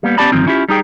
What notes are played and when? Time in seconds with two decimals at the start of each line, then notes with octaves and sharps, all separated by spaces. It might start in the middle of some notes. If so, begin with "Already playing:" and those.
0.03 G3 A#3 B3
0.18 B3 C#4 G4 D5 A5 B5
0.32 D2 G2 D#3 F3 C4
0.47 C#4 E4 F4 G4
0.69 G3 D#4 G#4 G5